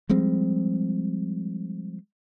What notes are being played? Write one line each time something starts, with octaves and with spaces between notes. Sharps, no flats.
F3 G3 G#3 C4